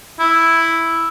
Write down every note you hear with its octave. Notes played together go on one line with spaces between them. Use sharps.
E4